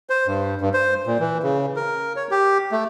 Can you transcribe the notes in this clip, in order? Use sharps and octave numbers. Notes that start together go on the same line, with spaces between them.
C5
G2
G2
C5
A#2
E3
C#3
A#4
C#5
G4
A3